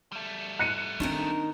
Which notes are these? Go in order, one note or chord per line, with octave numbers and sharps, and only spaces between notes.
G3 A3
F#6 C#7 D#7
D#3 C4 D4 D#4 A#4